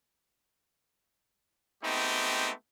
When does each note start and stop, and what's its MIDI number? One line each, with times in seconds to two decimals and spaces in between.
1.83 2.52 56
1.83 2.52 57
1.83 2.52 59
1.83 2.52 60
1.83 2.52 63
1.83 2.52 67